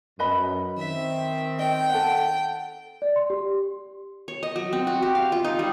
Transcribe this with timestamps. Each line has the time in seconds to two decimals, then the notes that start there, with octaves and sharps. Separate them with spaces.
0.19 F#2 B4 D#5 B5
0.78 D#3 C4 E5
1.59 D#5 G5
1.90 A4 F#5
3.02 D5
3.16 C6
3.30 G4
4.28 C#5
4.43 D#5
4.56 F#3
4.73 C4
4.87 F#4
5.03 G4
5.15 F5
5.32 F4
5.44 D#4
5.59 G3